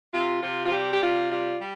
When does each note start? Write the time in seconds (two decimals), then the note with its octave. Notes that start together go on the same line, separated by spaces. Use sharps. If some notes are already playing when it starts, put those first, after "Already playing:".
0.12 C3 F4
0.41 C3 F4
0.65 F4
0.71 G3 G4
0.93 G4
1.01 C3 F4
1.31 G3 F4
1.60 G3